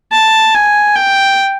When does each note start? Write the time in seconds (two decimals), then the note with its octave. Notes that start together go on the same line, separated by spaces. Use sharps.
0.12 A5
0.54 G#5
0.96 G5